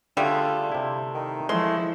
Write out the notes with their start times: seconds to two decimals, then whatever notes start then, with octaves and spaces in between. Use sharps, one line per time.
0.17 D3 G3 A3 F4 G4 G#4
0.72 C3 E4
1.14 D#3
1.49 F3 G#3 A3 E4 C6